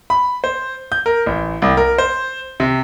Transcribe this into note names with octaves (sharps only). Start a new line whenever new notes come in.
B5
C5
G6
A#4
A1
C2
A#4
C5
C3